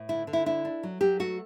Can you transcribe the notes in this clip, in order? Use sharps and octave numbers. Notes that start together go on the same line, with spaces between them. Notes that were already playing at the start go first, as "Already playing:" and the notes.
Already playing: A2
D3 E4
D3
E4
D4 E4
D4
F#3
F#3 G4
A3 F#4